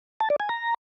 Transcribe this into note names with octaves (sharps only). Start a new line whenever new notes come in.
A5
D5
G#5
A#5